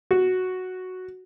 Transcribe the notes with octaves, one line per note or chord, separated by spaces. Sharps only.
F#4